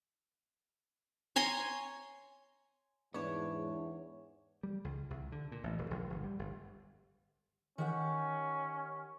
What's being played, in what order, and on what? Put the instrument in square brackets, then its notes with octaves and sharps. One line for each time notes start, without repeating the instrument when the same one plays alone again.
[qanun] C#5 G#5 A#5 C6
[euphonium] E2 [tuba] G#2 [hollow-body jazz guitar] B3 D4 [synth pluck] C#5
[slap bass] G3
C#2
C2
D3
A#2
A1
E1
A#1
G1
G3
G1
[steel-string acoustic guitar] D#3 G4 F#5 [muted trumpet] C#4